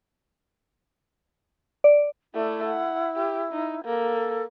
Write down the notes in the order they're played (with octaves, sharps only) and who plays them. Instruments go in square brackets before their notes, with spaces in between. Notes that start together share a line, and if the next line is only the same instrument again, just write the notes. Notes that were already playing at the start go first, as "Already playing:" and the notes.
[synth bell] D5
[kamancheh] A3 D5 [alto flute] E4
[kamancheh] F#5
G4
D#4
[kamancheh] A#3 [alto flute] A4